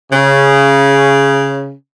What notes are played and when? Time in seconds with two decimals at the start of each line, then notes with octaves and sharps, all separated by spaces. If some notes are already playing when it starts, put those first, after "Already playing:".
0.12 C#3